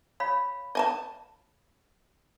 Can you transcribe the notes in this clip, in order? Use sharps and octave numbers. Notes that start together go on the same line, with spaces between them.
C#5 F5 B5
D#5 G#5 A5